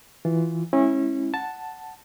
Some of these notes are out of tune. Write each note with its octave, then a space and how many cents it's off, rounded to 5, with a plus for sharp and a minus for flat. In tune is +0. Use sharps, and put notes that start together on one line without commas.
E3 +0 F4 +5
G#3 +20 C#4 -25 E4 -10
F#5 +0 A5 +0